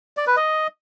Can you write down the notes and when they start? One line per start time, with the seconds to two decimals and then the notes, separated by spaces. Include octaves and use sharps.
0.17 D5
0.27 B4
0.37 D#5